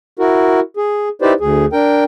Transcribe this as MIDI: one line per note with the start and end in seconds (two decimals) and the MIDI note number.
0.19 0.60 64
0.19 0.60 66
0.19 0.60 70
0.77 1.09 68
1.22 1.33 63
1.22 1.33 64
1.22 1.33 67
1.22 1.33 71
1.22 1.33 72
1.22 1.33 74
1.40 1.65 38
1.40 1.65 68
1.73 2.04 62
1.73 2.04 70
1.73 2.04 79